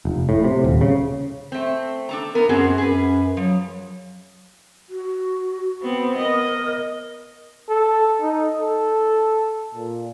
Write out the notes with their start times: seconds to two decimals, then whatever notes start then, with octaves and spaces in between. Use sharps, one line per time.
0.05 F1
0.29 A2
0.44 C3
0.64 D#1
0.81 C#3
1.52 A3 C4
2.09 D4 A4 A#5
2.35 B3 A#4
2.49 F#2 C4 F#4 G#4
2.78 F#2 G#4 B4
3.37 F3 F#3
4.90 F#4
5.83 B3 C4
6.18 A#4 D#5
7.69 A4
8.21 D#4
8.59 A4
9.74 A#2